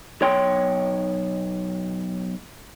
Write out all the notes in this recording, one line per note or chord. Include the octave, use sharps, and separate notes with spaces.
B1 C#5 G5 C6